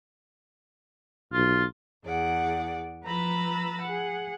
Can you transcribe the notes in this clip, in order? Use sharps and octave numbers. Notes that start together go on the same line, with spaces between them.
B1 F4
E2 G#4 D5 F#5
F3 B4 A#5 B5 E6 A6
G#4 F#5